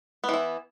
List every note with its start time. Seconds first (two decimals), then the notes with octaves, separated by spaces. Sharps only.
0.24 B3
0.29 E3
0.34 E4